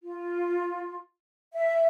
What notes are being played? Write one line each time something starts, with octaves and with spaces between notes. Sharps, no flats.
F4
E5